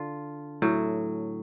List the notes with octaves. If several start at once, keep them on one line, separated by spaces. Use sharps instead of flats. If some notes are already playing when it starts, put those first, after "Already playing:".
Already playing: D3 F4
A2 F#3